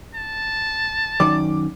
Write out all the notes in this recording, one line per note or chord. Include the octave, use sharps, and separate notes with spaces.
A5
F#2 D#3 D5 D6